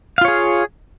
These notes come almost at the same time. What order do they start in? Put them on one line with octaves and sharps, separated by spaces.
F5 F4 C#5 G#4